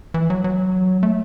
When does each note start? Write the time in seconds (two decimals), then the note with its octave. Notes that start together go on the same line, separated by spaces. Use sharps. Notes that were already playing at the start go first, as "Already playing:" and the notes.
0.14 E3
0.30 F#3
0.44 F#3
1.03 A3